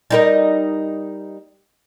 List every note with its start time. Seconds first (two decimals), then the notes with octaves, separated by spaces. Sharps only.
0.10 G3 D#4 A#4